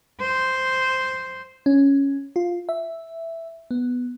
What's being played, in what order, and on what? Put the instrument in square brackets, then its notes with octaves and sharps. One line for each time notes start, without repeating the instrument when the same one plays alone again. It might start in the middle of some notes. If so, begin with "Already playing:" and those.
[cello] C5
[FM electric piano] C#4
F4
E5
B3